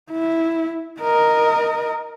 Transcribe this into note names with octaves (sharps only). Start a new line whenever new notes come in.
E4
A#4 D#5